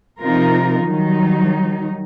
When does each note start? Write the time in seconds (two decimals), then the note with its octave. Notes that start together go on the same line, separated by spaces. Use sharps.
0.21 C3 F3 D#4 F4 A#4
0.84 D#3 F#3 G3 D#4